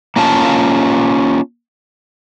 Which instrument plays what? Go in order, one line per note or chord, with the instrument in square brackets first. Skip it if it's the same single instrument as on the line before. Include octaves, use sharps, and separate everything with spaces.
[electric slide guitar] A#3 C#4 F4 A5